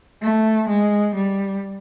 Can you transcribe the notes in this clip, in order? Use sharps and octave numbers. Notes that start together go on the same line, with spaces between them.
A3
G#3
G3